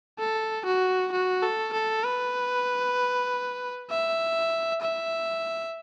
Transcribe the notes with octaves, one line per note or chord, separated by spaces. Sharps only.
A4
F#4
F#4
A4
A4
B4
E5
E5